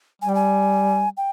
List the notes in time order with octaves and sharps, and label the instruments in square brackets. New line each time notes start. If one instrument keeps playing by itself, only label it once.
[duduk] G3 [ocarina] G#5
[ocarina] G5
G#5
G5